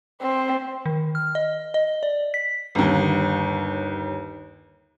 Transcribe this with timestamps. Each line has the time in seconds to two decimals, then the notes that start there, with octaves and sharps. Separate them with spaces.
0.22 C4
0.86 D#3
1.15 F6
1.35 D#5
1.74 D#5
2.03 D5
2.34 B6
2.75 G1 D#2